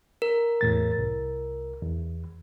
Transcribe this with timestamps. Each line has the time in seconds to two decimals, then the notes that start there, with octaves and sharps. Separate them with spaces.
0.22 A#4
0.61 E2 A2 A6
0.99 C2
1.82 E2